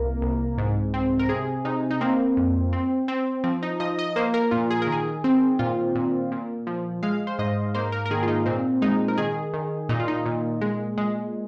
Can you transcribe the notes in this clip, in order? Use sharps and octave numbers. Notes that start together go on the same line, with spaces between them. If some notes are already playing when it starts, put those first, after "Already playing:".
Already playing: C2 A#3 A#4
C2
G#2
C4
A#4
C3 G#4
C3 D#4
D#4
A#3 C4
F2
C4
C4
F3 C4
D#4
F3 D#5
D#5
A#3 C5
A#4
A#2 F4
G#4
A#4
D#3 G#4
C4
A#2 F4
A#2
A#2
F3
G#3 F5
C5
G#2 D#5
A#3 C5
A#4
A#4
D#3 G#4
F4
D#4
A#2 C4
G#3 D#4
A#4
D#3 G#4
D#3
A#2 D#4
F4
D#4
A#2
G#3
G#3